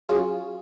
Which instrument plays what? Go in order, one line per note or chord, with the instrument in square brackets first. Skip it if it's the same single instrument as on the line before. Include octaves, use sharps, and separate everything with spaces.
[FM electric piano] F#3 C#4 F4 [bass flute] G#4